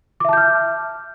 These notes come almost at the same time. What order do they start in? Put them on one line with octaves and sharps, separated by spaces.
D6 E5 A5 G6 F6